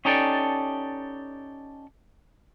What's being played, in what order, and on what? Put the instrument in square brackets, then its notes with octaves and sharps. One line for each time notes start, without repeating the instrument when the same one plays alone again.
[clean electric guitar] C#4 D#4 G4 A4 D5 A5